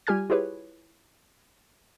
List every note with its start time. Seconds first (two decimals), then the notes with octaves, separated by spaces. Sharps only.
0.07 G3 F4 G4 G#5 F6 G#6
0.30 E4 F4 G4 G#4 B4 C#5